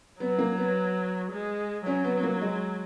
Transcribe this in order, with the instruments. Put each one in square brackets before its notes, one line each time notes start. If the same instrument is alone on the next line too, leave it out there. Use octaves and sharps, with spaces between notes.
[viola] F#3 [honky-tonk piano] B3
[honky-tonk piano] A#3
B3
[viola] G#3
[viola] F#3 [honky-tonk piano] C#4
[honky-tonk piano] B3
B3
A#3
G#3